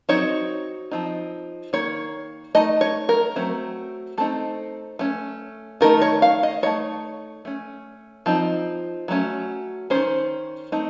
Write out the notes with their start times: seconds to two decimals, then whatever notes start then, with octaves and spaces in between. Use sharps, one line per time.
0.09 F#3 C4 D#4 C#5
0.91 F3 C4 D#4
1.73 D#3 A#3 C#5
2.55 A3 D#4 D#5
2.81 C#5
3.09 A#4
3.36 F#3 A3 C4
4.18 A3 C4 D#4 A4
4.99 A3 C#4
5.81 D#3 A3 D#4 A#4
6.02 C#5
6.22 F5
6.43 D#5
6.62 A3 D#4 C#5
7.45 A3 C#4
8.26 F3 C4 D#4
9.08 F#3 A3 C#4
9.90 A#3 C#4 C5
9.95 D#3
10.72 A3 C4 D#4